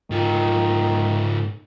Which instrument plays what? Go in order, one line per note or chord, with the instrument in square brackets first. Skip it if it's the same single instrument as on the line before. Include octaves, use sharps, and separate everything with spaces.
[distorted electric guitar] G#2 F4 [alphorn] D#3